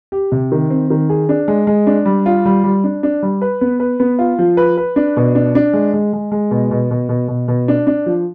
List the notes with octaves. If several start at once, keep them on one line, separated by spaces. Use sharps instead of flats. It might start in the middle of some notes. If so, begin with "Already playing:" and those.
G4
C3
D#3
C4
D#3
G#4
D4
G#3
G#3
D4
G3
F4
G3
G3
D4
D4
G3
B4
B3
B4
B3
F4
F3
B4
B4
D4
B2
D4
D4
G#3
G#3
G#3
G#3
B2
B2
B2
B2
B2
B2
D4
D4
F3